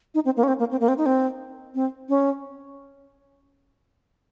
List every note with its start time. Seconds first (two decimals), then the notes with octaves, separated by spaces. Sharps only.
0.15 D#4
0.25 C4
0.37 A#3
0.43 C#4
0.48 C4
0.59 A#3
0.71 C4
0.81 A#3
0.88 C4
0.98 D#4
1.06 C4
1.75 C4
2.09 C#4